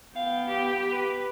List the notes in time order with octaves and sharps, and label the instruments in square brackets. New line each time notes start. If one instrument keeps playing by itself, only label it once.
[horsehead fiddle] B3 G5 [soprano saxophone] F5
[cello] G4
[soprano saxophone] B4